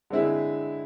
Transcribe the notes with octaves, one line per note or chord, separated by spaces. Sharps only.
D3 G#3 C4 E4 G#4